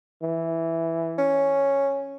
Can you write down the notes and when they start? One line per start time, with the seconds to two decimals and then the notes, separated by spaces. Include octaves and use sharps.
0.22 E3
1.18 C#4